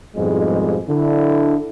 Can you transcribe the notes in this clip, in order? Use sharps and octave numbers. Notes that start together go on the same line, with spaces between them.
F2 G#2 B2 F3 G3 G#3
D3 E4